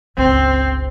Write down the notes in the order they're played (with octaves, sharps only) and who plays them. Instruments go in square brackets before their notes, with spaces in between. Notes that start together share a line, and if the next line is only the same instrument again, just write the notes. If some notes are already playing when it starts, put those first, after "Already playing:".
[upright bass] G1 C#2 [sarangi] C4